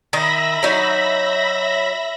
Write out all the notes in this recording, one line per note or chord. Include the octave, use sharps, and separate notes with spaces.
D#3 D#5 E5 B5 A#6
F#3 D#4